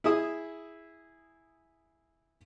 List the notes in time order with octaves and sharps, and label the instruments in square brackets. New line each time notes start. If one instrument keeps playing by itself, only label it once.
[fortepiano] E4 G#4 E5 D#6